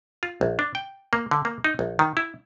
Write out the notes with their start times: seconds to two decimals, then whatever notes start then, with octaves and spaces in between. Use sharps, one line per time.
0.23 F4
0.41 A#1
0.59 D4
0.75 G5
1.13 A#3
1.31 D3
1.45 A#3
1.64 D#4
1.79 A#1
1.99 D#3
2.17 E4